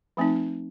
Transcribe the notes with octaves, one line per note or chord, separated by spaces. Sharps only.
F3 A3 C4 D#4